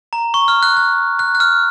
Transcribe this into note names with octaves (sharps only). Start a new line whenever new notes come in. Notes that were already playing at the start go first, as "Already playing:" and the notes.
A#5
C#6
F6
F#6
F#6
F#6
F#6
F6